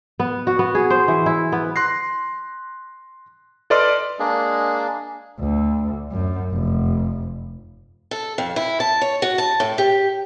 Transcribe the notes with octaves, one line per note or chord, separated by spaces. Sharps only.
B3
F#4
B3
G#4
C5
E3
E4
B3
C6 F#6 A#6 C7
A4 B4 D5 D#5 C6 F6
G#3 A#3 D4 G#4
D2
F#2
F1
A4
F2
E4
A5
C#5
F#4
A5
A2
G4